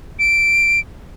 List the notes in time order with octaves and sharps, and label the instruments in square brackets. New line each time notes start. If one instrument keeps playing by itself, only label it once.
[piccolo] D7